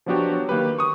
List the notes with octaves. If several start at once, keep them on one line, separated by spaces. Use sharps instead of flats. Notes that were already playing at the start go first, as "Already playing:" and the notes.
F3 F#3 B3 D4 F#4 G4
F#3
D#3 A#3 G4 B4
C#6 D#6